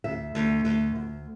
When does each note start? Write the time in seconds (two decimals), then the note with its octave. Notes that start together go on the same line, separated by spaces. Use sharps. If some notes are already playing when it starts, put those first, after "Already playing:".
0.04 D2 E5
0.35 D2
0.65 D2
0.96 D2